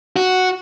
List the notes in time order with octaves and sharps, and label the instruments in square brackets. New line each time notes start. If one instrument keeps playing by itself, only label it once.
[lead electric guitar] F#4